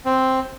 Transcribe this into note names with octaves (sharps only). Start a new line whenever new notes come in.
C4